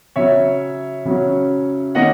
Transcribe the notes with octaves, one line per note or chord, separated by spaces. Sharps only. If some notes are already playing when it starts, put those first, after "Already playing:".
C#3 F#3 C#4 C#5 E5
C#3 F#3 C#4
D#3 A#3 C#4 D#5 F#5